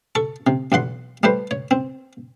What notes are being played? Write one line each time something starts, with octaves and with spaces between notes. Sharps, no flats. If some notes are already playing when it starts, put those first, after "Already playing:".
A4 C#6
C3
B1 E2 F#5 C6
G3 A3 B4 C5
C#5
C4